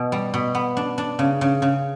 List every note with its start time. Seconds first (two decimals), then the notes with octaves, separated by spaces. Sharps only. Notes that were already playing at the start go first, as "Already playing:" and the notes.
Already playing: B2
0.12 G3
0.34 B2
0.55 B3
0.77 D4
0.98 D4
1.19 C#3
1.41 C#3
1.62 C#3